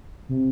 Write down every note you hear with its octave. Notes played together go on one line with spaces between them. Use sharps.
C3